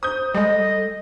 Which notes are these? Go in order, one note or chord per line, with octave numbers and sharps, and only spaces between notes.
C5 D#6 G6
G3 G#3 A4 D#5